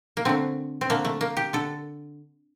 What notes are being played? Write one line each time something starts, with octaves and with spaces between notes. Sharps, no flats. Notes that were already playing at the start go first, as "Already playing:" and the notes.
A#3
D3 A3 C4
C4
D3 A3 A#3
A3
A#3
G4
D3 A4